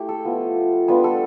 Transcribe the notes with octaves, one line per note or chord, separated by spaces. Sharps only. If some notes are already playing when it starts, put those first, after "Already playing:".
Already playing: A3 E4 G4
A4
F3 B3 F4
G3 B3 D4 F4 B4
A4